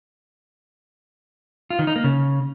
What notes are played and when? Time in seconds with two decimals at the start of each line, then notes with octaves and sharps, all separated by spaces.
1.70 F4
1.79 D#3
1.87 D#4
1.96 A#3
2.04 C#3